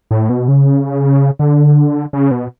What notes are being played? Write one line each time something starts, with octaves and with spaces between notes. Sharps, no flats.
A2
B2
C#3
D3
C#3
B2